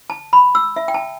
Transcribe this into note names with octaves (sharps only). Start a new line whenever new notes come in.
A5
B5
E6
E5
G5
A5